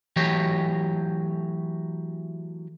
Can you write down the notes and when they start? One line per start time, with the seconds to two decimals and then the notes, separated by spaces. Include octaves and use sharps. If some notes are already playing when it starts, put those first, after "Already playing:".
0.16 E3 F#3 A3 G4 C#5